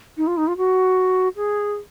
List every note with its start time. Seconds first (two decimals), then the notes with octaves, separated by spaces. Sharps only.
0.17 D#4
0.27 F4
0.37 D#4
0.48 F4
0.57 F#4
1.36 G#4